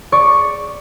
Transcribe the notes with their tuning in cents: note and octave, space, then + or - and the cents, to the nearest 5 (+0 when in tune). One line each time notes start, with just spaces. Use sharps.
D5 +0 C#6 +0